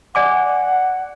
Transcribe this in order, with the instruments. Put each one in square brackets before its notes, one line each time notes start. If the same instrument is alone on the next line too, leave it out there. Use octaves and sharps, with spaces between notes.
[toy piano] D5 G#5 D6 [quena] F#5